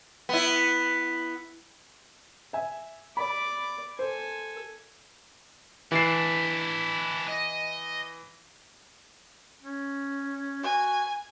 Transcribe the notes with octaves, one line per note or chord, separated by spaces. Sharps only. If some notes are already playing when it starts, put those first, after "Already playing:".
B3 E4
E5 G#5
D5 B5
A4 C5 G#5
E3 D4 E4 C7
D#5
C#4
F#4 G#5